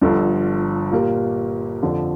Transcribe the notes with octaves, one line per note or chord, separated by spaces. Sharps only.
G1 G2 D3 F3
A#2 A#3 G4 A#4
F2 D3 F3